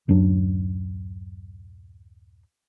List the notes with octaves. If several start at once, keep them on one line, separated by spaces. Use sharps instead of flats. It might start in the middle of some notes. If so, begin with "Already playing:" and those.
D1 F#2 F#3 D4